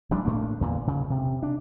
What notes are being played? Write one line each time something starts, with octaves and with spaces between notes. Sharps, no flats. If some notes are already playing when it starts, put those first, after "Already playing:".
A1 F3 G3 D4
A2 A3 A#3 D4
E2 A#2 D3
C#3
C3
D4